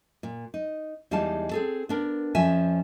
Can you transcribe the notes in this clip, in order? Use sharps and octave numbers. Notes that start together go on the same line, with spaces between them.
A#2
D#4
E2 G3 G#3 D#4 F5 A5
C4 G#4 A4
B3 D4 A#4
F2 F3 C#4 E5 G#5